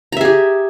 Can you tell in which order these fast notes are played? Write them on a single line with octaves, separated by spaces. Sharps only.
A#5 E5 G#4 G4